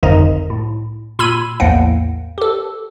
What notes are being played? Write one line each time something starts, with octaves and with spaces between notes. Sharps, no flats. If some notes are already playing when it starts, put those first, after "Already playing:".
G1 C2 F2 D#3 D#4 D#5
A2
A#2 B5 C6 E6 G#6 D#7
A#1 E2 A2 A#3 F#5 G5
G4 A4